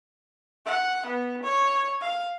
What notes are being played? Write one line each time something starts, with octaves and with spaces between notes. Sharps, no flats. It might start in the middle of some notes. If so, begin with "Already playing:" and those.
F#5
B3
C#5
F5